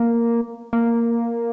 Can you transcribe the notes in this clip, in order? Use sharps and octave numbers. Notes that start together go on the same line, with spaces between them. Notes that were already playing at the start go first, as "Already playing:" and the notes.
Already playing: A#3
A#3